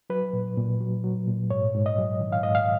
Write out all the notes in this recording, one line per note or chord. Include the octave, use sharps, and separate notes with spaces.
F#3 B4
A#2
A#2
F#3
F#3
A#2
G#2 C#5
G#2
D#5
F#3
D#3
F5
G#2 D#5
F5